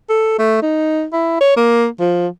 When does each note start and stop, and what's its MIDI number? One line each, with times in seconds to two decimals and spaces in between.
0.09 0.34 69
0.39 0.58 57
0.62 1.05 63
1.13 1.38 64
1.41 1.55 73
1.57 1.87 58
2.00 2.27 53